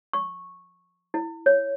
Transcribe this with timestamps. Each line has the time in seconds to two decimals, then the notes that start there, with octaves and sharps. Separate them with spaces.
0.13 C#6
1.14 E4
1.46 C#5